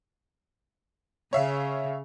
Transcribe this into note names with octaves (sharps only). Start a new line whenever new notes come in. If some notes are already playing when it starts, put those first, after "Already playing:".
C#3 C#5 E5 F5